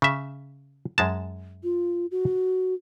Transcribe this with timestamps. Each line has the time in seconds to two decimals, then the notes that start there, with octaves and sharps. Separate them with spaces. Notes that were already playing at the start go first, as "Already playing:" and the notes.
0.02 C#3 E5
0.98 F#2 G#3 A5
1.64 F4
2.11 F#4